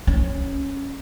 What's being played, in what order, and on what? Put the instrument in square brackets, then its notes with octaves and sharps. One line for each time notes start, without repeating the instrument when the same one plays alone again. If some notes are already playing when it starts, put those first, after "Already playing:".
[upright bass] C#4